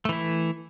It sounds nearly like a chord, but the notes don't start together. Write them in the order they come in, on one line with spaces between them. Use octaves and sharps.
A3 E3 E4